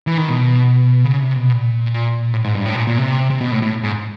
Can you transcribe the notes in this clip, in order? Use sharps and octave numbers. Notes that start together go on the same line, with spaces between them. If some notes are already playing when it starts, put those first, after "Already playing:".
E3
D#3
B2
C#3
C3
B2
A#2
A2
G#2
G2
A2
A#2
A#2
C3
C3
B2
A2
A2
G#2